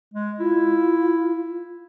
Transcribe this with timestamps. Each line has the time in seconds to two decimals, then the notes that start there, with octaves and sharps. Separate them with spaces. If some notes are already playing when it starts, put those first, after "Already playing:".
0.14 G#3
0.40 E4 F4